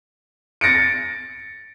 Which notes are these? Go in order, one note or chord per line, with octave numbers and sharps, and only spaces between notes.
A6 A#6 C#7 D7